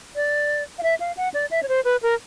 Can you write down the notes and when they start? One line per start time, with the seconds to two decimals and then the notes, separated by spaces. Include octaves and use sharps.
0.15 D5
0.78 F5
0.83 E5
1.00 F5
1.17 F#5
1.34 D5
1.51 E5
1.63 C#5
1.68 C5
1.84 B4
2.02 A#4